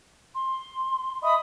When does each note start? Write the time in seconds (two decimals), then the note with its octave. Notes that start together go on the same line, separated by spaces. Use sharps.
0.35 C6
1.22 D#5 E5 B5 D#6